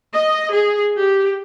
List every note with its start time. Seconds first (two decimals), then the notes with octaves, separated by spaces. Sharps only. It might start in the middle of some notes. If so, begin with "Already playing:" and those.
0.15 D#5
0.53 G#4
0.99 G4